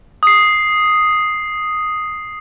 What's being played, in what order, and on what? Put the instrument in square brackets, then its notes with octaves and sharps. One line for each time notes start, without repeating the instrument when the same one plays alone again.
[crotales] D#6 C7